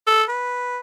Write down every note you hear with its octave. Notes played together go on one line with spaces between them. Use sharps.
A4
B4